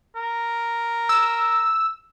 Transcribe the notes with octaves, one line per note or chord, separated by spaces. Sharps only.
A#4
E6